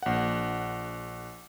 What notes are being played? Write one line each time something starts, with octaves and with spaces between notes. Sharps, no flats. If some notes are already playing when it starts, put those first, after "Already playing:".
A#1 F#5